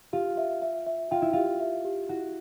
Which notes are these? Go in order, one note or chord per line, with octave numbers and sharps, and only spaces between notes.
F4 G4
E5
E5
E5
F4 G5
E4
F4 G4
E5
G4
E4 F#4